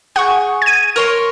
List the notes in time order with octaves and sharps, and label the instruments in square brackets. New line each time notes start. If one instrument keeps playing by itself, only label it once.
[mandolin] G#4 C#6 [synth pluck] F#5
[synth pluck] G#6 D#7
[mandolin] A#4 C#5 C6